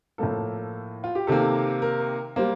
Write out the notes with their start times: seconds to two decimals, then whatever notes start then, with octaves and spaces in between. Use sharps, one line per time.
0.18 A2 F3 A#3 A4
1.04 F4
1.15 G4
1.27 C3 D#3 A#3 A4
1.82 A#4
2.36 G3 A#3 C5